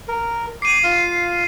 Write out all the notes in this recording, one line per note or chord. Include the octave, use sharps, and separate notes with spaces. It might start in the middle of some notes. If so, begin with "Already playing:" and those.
A#4
D6 C7 D#7
F4 F5